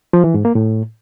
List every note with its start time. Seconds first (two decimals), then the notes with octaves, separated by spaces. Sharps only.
0.13 F3
0.24 E3
0.34 G#2
0.45 A#3
0.55 A2